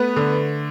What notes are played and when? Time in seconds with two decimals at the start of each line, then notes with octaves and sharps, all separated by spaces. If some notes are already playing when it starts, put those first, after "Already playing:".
Already playing: A3 B3 B4
0.16 D3